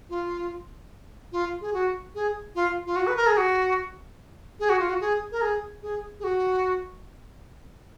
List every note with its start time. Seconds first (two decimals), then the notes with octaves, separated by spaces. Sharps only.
0.09 F4
1.32 F4
1.61 G#4
1.73 F#4
2.15 G#4
2.55 F4
2.86 F4
2.96 F#4
3.07 B4
3.16 A#4
3.27 G#4
3.37 F#4
4.60 G#4
4.69 F#4
4.80 F4
4.89 F#4
5.01 G#4
5.32 A#4
5.42 G#4
5.83 G#4
6.20 G#4
6.24 F#4